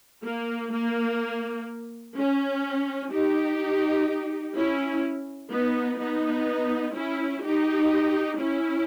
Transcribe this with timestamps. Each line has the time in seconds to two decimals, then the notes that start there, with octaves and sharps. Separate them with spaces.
0.24 A#3
0.72 A#3
2.16 C#4
3.12 D#4 G4
4.56 C#4 E4
5.52 B3 D#4
6.00 B3 D#4
6.95 C#4 E4
7.44 D#4 G4
8.40 C#4 E4